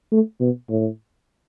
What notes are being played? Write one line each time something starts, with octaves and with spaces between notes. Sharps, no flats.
A3
B2
A2